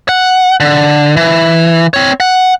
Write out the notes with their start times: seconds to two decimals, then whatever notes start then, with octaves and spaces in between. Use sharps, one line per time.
0.09 F#5
0.60 D3
1.16 E3
1.94 C4 C#5
2.20 F#5